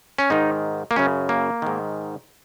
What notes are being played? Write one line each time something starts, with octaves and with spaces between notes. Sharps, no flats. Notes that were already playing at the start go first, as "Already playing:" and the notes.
C#4
G#2 D#3 D#4
A#3
F#2 C#3 C#4
A#3
G#2 D#3